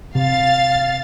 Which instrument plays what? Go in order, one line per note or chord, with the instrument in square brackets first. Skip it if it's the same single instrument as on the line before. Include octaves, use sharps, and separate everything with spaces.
[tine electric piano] C3 [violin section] F5 A6